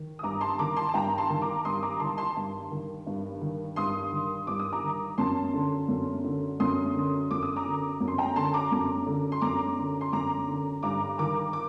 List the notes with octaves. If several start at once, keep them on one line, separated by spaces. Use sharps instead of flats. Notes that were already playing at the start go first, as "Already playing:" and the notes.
Already playing: D#3
D#6
G2 A#5 D6
A5 C6
D#3 A#5 D6
A5 C6
A5
G2 G5 A#5
A5 C6
D#3
A#5 D6
G2 C6 D#6
A#5 D6
D#3 A5 C6
A5 C6
G2
D#3
G2
D#3
G2 C6 D#6
D#3
G2 D6
D#6
A#5 D6
D#3
F#2 A5 C6
D3
F#2
D3
F#2 C6 D#6
D3
F#2 D6
D#6
A#5 D6
D3
F#2
C6
G5 A#5
D3 A5 C6
A#5 D6
F#2
D3
C6
F#2 A#5 D6
D3
C6
F#2 A#5 D6
D3
G2 A#5 D6
D#3 A#5 D6
D6